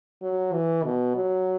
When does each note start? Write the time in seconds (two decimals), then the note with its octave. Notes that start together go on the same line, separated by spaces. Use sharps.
0.22 F#3
0.53 E3
0.84 B2
1.16 F#3